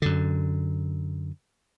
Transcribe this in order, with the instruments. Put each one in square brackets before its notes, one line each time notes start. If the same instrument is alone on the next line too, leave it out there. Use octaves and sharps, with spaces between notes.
[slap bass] F#2 D3